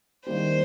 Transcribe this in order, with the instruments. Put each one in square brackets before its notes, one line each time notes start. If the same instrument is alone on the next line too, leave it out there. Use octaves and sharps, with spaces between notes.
[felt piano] D#3 G3 A#3 G4 [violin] C5